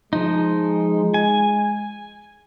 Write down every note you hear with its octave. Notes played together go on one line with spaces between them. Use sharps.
F3 G#3 D#4
G#5